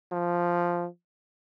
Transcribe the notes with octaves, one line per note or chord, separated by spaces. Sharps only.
F3